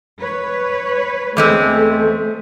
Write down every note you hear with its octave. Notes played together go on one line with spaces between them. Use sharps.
B4 C#5
E2 G#3 A3 C4 A4